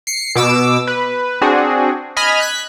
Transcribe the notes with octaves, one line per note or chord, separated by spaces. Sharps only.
C7 C#7
B2 D6 E6
B4
C4 D4 F#4 G#4
D#5 G#5 B5 F6
F#6 G#6 B6